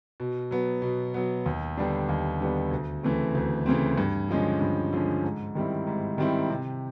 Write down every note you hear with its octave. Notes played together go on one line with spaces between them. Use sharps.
B2
F#3 B3
B2
F#3 B3
D#2
D3 G3 B3 D4
D#2
D3 G3 B3 D4
D2
C#3 E3 A3 C4
D2
C#3 E3 A3 C4
G2
D3 F3 G#3 C#4
G2
D3 F3 G#3 C#4
G#2
D#3 G3 C4 E4
G#2
D#3 G3 C4 E4
C3